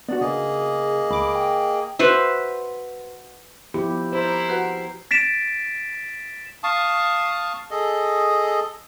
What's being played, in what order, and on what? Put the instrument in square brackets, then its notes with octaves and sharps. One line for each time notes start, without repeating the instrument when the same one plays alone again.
[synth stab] B3 D4 F#4 [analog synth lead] D5
[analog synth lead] C#3 [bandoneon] A#3 G#4 D#5
[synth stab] C#2 D6 [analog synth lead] B5
[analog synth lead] G5
[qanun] F#4 B4 C5 E5
[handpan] F3 E4 G4 [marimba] B3
[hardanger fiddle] E4 A#4 [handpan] C5
[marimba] F#4 B4 F#5
[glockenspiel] A6 B6 D7 E7
[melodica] F5 A5 C#6 D#6
G#4 A4 D#5